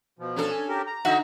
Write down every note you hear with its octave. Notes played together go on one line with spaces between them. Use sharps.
B2 F3
C#4 D4 A4
G#5
G4 A#4
A#5
D3 D#4 F#4 E5